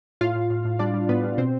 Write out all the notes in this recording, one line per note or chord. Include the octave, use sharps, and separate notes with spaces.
A2 F4 F5
A2
A2
A2
G3 D4 D5
G3
A2 B3 B4
G3
B2 C4 C5